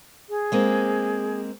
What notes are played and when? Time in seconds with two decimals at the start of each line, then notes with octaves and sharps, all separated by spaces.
0.29 G#4
0.52 G#3 A#3 C4